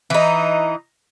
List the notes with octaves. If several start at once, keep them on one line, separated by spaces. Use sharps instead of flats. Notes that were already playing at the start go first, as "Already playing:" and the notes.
E3 D#4